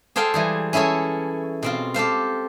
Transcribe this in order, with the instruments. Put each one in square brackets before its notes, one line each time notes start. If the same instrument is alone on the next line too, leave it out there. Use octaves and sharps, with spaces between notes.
[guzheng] G#4 A4 C5 F5 G5
E3 G3 G#4
C#4 E4 G#4 A4 C#5
B2 C4 F4
G4 A4 C5 F5